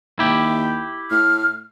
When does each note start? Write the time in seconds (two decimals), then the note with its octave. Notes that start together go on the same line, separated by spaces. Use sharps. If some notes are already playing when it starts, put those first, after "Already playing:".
0.19 D#2 E4 G4
1.11 A2 F6